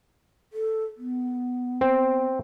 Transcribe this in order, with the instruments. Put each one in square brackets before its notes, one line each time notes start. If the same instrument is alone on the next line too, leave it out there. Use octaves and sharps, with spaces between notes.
[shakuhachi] A4
B3
[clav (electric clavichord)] C4